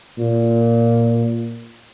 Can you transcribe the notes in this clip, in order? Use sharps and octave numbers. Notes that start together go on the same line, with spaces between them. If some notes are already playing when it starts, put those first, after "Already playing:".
A#2